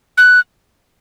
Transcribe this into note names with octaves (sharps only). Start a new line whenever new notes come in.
F#6